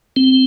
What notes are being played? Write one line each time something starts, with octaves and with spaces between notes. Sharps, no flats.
C4